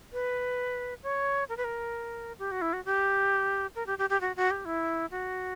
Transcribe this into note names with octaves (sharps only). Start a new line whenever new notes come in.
B4
C#5
A#4
B4
A#4
G4
F#4
E4
F#4
G4
A#4
G4
G4
G4
F#4
F#4
G4
E4
F#4